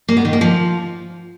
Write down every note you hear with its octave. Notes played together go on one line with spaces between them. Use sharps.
A#3
B3
D#3
A#3
F3